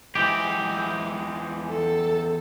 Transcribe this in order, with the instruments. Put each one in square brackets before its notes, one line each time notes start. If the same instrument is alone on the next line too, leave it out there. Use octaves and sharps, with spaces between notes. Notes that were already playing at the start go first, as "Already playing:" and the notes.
[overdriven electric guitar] E2 C4 [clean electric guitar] E3 G#3 G4
[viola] A4